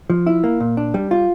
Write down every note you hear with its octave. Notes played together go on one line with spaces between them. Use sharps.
F3
E4
A#3
A#2
D4
G3
F4